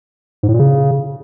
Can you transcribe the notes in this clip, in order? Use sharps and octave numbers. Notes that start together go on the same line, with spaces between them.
G#2
A2
A#2
C#3